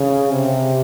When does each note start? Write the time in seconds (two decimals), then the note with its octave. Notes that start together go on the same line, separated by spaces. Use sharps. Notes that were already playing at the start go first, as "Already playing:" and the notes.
Already playing: C#3
0.31 C3